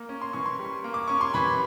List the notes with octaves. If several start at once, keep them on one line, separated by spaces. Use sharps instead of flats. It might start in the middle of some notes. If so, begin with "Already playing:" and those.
Already playing: A#3
C#4
C6
E3 C#6
C6
G3
A#3
D6
C#4 C#6
C6
E3 B5